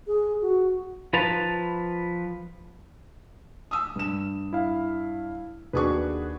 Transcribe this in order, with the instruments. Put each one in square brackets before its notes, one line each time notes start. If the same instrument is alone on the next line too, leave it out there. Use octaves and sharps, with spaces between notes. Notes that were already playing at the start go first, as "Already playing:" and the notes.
[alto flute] G#4
F#4
[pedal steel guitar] F3 B4 A5 A#5
[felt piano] D#6 E6
G2 E7
[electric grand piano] E4 F5
[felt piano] D#2 D4 C#6 [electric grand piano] F#4 G#4 B4